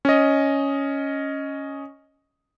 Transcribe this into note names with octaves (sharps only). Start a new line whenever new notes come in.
C#4 D#5